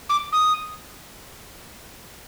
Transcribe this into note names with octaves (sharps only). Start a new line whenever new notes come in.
D6
D#6